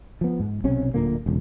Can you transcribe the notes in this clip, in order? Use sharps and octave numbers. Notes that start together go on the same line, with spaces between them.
F3 B3
G#2
B1 C3 C#4
D1 A#2 D3 A#3
E1 C#2